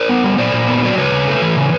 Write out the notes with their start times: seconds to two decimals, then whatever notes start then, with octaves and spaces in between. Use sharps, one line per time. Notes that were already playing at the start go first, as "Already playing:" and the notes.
Already playing: A#4 C5
0.09 B3
0.24 G3
0.38 A#2 C5 D5
0.53 A#2
0.68 B3
0.83 F#3 D5
0.98 C#3 B4 C#5
1.12 C#3
1.28 A3
1.42 E3
1.57 C#3